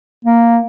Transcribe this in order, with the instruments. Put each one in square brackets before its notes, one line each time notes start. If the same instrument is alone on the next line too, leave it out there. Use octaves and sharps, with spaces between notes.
[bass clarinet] A#3